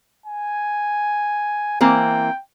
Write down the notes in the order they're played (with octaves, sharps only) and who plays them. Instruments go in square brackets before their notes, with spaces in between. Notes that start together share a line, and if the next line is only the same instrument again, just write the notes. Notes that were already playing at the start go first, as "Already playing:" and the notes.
[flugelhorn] G#5
[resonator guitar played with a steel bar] E3 A#3 C4 [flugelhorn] G5